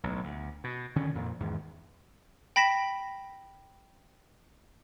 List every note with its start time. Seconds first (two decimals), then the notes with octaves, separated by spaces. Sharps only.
0.04 B1 A2
0.24 D2
0.64 B2
0.96 D3 D#3 C#4
1.15 F2 A#2
1.40 E2 G#2 D#3
2.56 G5 B5 A#6 B6 E7